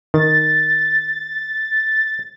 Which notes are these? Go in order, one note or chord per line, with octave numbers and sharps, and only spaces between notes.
D#3 A6